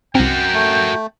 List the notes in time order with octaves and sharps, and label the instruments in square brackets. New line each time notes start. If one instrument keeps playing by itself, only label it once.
[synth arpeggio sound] C2 C4 [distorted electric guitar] F#4 A#4 [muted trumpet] G5
[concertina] A3